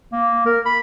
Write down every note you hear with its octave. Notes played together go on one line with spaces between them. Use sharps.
A#3
A#4
B5